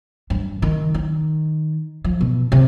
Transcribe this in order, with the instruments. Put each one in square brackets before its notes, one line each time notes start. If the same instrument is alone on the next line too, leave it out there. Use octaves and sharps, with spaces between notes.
[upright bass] G2
D#3
D#3
F3
B2
C3